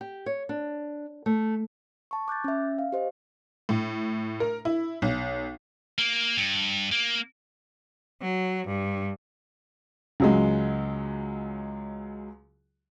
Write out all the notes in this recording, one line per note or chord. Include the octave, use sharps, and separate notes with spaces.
G4
C#5
D4
A3
A5 C#6
D6 F#6 G6 A6
C#4 E5
F5
G4 C5 D#5
A2
A#4
E4
B1
A#3
G2
A#3
F#3
G2
C#2 F#3 G#3